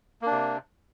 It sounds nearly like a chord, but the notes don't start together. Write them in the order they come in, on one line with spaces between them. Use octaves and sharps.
A#3 D4 C3